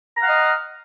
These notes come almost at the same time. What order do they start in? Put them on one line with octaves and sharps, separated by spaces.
A#5 F5 F#5 F6 D#5